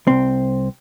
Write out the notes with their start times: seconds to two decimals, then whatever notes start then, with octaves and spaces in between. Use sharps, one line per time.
0.07 C2 C4